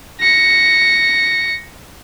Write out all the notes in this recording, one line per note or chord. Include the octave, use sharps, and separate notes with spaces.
A#6 C#7